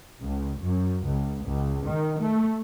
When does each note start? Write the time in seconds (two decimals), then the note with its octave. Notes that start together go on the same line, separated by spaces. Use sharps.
0.22 C#2
0.60 F#2
1.05 C#2
1.46 C#2
1.86 D#3
2.21 A3